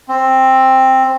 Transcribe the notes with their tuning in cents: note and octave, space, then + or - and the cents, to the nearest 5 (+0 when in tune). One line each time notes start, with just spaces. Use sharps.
C4 +10